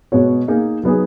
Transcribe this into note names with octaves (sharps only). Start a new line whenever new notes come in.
B2 G#3 B3 F#4 C#5
A#3 D#4 G#4
F#3 B3 D#4 G#4